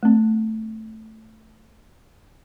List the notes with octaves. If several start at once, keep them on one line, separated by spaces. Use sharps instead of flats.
A3 C4